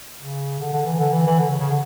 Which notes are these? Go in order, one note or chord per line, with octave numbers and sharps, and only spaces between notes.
C#3
D3
D3
E3
D3
E3
E3
D3
C#3
C#3
D3